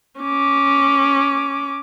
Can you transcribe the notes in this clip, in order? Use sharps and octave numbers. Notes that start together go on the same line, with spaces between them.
C#4 D6